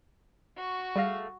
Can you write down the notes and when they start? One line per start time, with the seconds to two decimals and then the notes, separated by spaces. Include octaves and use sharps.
0.57 F#4 C#6
0.96 G3 A3 G#4 F5 A#6